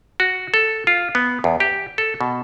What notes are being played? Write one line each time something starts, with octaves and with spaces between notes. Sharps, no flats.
F#4
A4
F4
B3
E2
G4
A4
B2